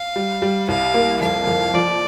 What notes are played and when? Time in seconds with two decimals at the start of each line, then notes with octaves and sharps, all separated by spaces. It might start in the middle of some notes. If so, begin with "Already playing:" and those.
Already playing: F5
0.16 G3
0.42 G3
0.68 C2 F5
0.94 A#3
1.21 F2 F5
1.47 F2
1.74 F3 D5